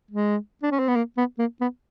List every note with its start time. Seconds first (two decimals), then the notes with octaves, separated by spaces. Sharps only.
0.11 G#3
0.63 D4
0.71 C#4
0.79 C4
0.88 B3
0.96 A#3
1.17 B3
1.39 A#3
1.61 B3